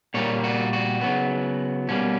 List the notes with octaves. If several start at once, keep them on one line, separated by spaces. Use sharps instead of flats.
A#2 G3 A#3 C#5
F#4
F#4
C#3 F#3 B3
B2 G3 A#3 C#4